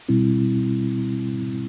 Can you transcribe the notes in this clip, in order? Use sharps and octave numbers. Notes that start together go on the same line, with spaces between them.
B2 G3 C4 E4